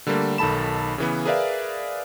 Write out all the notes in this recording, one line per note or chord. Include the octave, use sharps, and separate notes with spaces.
D3 G3 A3 A#3
B1 D#3 A4 A5 B5 E7
C#3 E3 B3
G#4 A#4 B4 D5 E5 F5